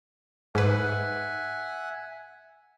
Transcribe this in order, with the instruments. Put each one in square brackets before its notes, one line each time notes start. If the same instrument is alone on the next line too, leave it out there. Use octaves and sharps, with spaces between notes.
[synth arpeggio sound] G#2 B4 [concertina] E5 F#5 G#5